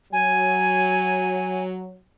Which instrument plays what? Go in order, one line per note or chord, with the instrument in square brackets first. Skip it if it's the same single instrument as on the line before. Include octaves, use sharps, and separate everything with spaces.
[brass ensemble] F#3 [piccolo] G#5